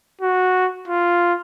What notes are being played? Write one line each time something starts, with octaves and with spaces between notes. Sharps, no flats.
F#4
F4